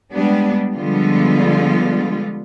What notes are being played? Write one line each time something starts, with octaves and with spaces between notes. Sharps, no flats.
G3 G#3 B3 D4
D3 F3 G3 G#3 B3 F4